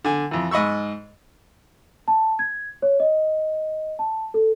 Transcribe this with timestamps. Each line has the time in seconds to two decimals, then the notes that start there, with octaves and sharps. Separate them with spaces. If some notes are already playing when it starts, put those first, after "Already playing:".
0.05 D3 G#5
0.31 F2 E3
0.51 G#2 D#5 B5 C#6 E6
2.08 A5
2.39 G#6
2.82 C#5
3.00 D#5
3.99 A5
4.34 A4